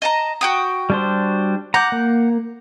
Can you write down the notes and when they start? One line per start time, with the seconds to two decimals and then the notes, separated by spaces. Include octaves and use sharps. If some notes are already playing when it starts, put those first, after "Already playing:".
0.02 D#5 A5 A#5
0.41 F#4 G5 D#6
0.90 G3 D4 C5
1.74 F#5 A#5 D6 G6
1.92 A#3